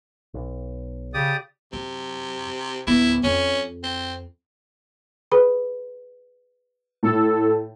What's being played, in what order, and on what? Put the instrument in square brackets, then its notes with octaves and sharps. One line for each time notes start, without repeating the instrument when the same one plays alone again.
[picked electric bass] B1
[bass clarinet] C#3 [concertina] G4 D5 D#6
[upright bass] F#2 [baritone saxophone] C3
[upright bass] D1 B3 [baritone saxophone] E4
[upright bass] F2 [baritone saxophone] C#4
[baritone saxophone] C4
[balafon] G#4 B4 B5
[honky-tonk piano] A2 [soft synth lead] A4